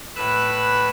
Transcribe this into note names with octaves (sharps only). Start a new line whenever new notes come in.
A2 B4 E6 F#6